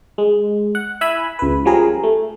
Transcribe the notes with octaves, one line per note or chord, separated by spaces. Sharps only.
G#3
F#5
E4 E5 G#5 B5
C#2 B4
F3 G3 C#4 G#4 A#4
A3